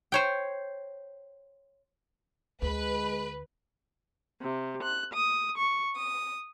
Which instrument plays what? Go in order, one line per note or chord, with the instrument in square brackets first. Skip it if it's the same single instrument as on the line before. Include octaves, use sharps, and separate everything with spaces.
[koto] C5 C#5 G5
[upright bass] D2 [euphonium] G#3 [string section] B4
[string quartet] C3
F#6
D#6
C#6
D#6